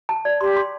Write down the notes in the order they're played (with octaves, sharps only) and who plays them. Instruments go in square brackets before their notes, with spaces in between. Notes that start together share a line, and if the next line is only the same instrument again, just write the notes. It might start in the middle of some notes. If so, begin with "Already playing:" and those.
[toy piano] A5
D5
[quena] G4 [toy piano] C6
[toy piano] C6